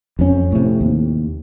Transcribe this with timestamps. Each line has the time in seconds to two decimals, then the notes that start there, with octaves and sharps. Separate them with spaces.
0.19 F2 C#4
0.52 A2 C3
0.81 D#2